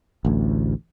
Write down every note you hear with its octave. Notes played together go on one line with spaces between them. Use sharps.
A1 D2